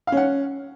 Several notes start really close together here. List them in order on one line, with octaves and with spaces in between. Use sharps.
F5 C#4 F#5